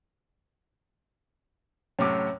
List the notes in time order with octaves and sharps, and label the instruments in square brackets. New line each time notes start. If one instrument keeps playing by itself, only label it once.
[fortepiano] F#2 A2 C3 [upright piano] C#4 D6